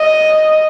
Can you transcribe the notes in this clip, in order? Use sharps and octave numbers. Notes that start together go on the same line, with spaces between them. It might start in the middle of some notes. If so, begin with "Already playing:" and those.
Already playing: D#5